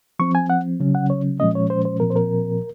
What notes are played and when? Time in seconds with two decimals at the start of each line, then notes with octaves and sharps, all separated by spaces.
0.19 F3 C4 C#6
0.35 G#5
0.50 F#5
0.80 C#3 F#3 C#4
0.95 F#5
1.10 C#5
1.40 A#2 F3 G#3 C#4 D#5
1.55 C#5
1.70 C5
1.85 C5
2.00 A#2 F3 C4 A#4
2.10 C5
2.16 A#4